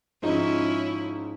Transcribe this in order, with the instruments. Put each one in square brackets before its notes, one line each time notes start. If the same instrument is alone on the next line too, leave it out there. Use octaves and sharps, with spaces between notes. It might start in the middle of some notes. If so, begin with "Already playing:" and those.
[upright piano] G#2 F3 D#4 [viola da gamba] C#4 E4